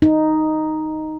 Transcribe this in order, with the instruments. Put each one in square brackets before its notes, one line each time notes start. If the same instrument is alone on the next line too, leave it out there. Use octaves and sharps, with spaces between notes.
[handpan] D#4